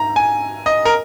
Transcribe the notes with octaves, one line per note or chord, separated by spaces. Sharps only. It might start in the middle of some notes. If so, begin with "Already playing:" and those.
Already playing: G#2 A#5
G#5
D#5
A#4